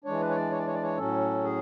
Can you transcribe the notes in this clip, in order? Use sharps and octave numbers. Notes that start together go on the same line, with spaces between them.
E3 G#3 D4 C#5
B4
C#5
D5
C#5
D5
C#5
D5
C#5
A2 F#3 C#4 A4
G#4